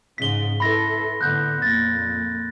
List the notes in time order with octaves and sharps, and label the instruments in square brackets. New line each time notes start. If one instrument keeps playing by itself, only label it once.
[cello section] G#2 C#3 G#3 [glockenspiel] B6 G7
[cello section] E4 A4 B4 [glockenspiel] B5 C6 A#6
[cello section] A2 D3 B3 [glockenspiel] F#6 G6
[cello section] F2 A#2 [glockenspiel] A6 A#6